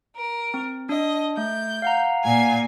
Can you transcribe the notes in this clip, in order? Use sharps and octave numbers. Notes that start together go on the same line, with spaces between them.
A#4
C4
D4 D#5
A3 G6
F5 F#5 A#5
A#2 G#5 G#6